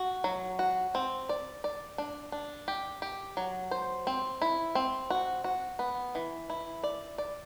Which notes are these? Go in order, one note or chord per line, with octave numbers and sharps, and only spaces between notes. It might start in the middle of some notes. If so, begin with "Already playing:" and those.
Already playing: F#4
F#3
F#4
C4
D5
D5
D4
D4
G4
G4
F#3
C5
C4
E4
C4
F#4
F#4
B3
E3
E4
D5
D5